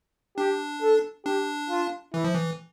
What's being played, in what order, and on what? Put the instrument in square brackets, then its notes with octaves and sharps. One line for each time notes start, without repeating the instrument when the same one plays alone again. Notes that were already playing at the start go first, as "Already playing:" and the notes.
[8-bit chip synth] D4 [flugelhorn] G4
[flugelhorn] A4
[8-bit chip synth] D4 [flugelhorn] G4
[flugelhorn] F4
[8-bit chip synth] E3 [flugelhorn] E4
[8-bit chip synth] F3
E3